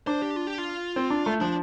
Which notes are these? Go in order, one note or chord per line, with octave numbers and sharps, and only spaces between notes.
D4 C5
G4
F4
G4
F4
C4
D4
A3
F3 D4